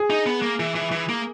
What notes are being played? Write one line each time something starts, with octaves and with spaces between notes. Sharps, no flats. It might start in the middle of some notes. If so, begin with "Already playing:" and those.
Already playing: G#4
D#4
B3
A#3
E3
E3
E3
A#3